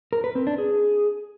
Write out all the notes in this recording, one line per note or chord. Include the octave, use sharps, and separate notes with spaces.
A#4
B4
C4
D4
G#4